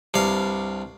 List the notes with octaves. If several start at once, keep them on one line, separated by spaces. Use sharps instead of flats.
C2 G2 F5